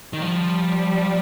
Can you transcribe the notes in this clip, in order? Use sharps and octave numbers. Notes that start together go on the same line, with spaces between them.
D#3
F3 G3